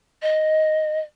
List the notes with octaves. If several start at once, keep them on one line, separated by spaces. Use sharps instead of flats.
D#5